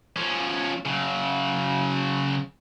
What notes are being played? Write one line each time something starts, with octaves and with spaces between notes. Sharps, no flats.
F3 C#4
C#3 F#3